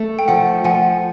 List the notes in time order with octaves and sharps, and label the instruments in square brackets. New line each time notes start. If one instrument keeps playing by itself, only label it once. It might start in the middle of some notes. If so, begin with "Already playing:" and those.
Already playing: [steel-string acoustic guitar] A3
[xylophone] G5
[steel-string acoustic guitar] F3 [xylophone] F#5
[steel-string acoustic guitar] F3 [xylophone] F#5 G#5